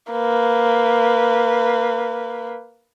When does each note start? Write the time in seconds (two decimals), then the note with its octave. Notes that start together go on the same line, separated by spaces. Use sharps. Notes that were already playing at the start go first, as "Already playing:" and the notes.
0.12 A#3 B4